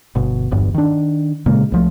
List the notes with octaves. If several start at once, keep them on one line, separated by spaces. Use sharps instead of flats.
G1 B2
D1 G1 E2 G2
D#3 D4
A#2 C#3 G#3 A#3
C2 F3 A3